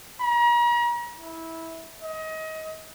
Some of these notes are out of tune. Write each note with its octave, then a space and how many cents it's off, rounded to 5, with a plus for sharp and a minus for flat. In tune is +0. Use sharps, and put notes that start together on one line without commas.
A#5 +40
E4 -15
D#5 +30